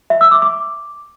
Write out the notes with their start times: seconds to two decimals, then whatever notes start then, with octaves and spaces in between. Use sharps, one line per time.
0.10 E5
0.21 E6
0.31 D6
0.42 D6